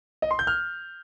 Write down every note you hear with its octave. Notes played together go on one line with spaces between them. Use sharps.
D#5
C6
G6
F6